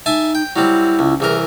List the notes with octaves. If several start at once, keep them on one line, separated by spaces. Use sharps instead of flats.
D#4 E5 G#5 A5
G5
F#3 G3 C4 E4
C#2
C2 E3 G#4 A#4